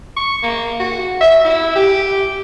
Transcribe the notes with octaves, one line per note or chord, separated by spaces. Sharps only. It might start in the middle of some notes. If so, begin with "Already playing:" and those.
C#6
A#3
F#4
E5
E4
G4